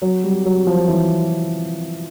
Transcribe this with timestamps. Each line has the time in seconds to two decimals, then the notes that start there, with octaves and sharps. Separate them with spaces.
0.02 F#3
0.24 G3
0.45 F#3
0.67 F3
0.88 E3